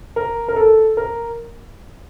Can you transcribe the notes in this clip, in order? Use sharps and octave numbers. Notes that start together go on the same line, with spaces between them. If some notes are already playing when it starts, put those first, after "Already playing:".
A#4
A#4
A4
A#4